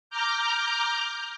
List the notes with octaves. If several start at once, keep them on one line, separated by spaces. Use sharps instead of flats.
A#5 D6 F6 G6